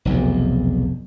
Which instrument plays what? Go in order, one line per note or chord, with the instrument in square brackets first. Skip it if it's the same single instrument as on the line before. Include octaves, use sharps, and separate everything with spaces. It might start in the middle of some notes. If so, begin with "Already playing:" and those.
[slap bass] F1 B1 E2